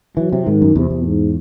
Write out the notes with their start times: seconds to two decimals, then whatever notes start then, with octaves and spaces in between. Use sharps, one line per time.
0.17 E3 F#3
0.33 C3
0.46 G#2 D#3
0.62 F#2
0.75 E2 C3
0.90 E2
1.05 G#2